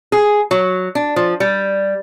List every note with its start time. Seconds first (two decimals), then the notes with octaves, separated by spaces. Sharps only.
0.12 G#4
0.51 F#3
0.95 D4
1.16 F3
1.40 G3